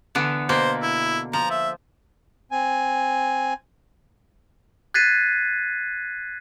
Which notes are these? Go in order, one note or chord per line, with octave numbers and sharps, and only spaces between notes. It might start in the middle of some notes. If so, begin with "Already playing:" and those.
D3 E3 B3
B2 A#3 C5
E4
F3 A#5
E5
C4 G#5
F#6 G#6 A6 B6 C7 D#7